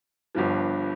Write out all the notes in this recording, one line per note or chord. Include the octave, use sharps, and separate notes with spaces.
G1 G2 F3